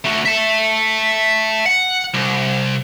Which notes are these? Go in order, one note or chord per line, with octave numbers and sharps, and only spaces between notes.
A3 F#4
E5 A5
F#5
C2